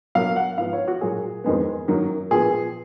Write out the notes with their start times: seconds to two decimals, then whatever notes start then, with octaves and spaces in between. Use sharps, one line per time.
0.15 B2 F#3 A#3 F5
0.36 F#5
0.58 G#2 F3 B3 F5
0.73 C#5
0.88 F#4
1.01 A#2 F#3 A#3 G#4
1.44 F2 D#3 G#3 B3
1.88 F#2 D#3 F#3 A#3
2.31 A#2 F3 B3 G#4